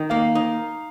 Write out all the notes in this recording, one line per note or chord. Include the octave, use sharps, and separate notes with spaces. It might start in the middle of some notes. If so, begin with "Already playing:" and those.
Already playing: D#3
A#3 F5
D#4